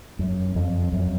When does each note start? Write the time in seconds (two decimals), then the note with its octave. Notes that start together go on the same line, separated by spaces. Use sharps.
0.19 F#2
0.55 F2
0.93 F#2